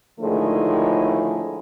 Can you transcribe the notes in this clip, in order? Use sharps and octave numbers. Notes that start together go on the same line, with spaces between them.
A2 D3 D#3 F3 G#3 A3